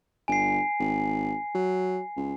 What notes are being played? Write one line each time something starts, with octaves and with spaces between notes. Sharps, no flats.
G1 G#5 C7
G#1
F#3
C#2